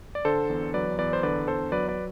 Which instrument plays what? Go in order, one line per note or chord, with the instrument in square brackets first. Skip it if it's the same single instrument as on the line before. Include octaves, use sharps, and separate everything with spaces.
[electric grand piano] D5
D3 A4 C5
E2
F#3 B4 D5
E2 B4 D5
C5
D3 B4 D5
E2 A4 C5
F#3 B4 D5
B4 D5